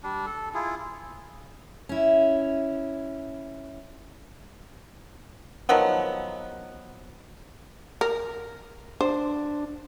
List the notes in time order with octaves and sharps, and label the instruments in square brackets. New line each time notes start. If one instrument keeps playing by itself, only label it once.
[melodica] G3 D4
A4
E4 F4 G#4
[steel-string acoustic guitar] C#4 E4
[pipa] D#3 F3 F#3 B3
[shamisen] A#4
[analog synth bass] D4 [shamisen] C5